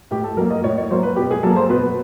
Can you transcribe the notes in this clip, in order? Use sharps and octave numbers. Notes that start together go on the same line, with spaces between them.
A2 G4
A4
F#3 A#3 A#4
D#5
A2 C#5
C#5
F#3 A#3 C5
B4
B2 G4
G#4
F#3 A#3 A4
C5
B2 B4